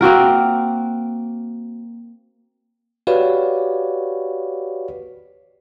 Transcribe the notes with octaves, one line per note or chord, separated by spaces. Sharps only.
A#3 C4 F#4 A#4
F#4 G4 B4 C#5 D5 F5